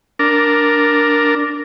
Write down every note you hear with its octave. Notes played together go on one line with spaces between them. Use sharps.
D4 A#4